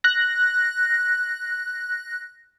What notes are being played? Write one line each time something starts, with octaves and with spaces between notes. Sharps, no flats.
F#6 A#6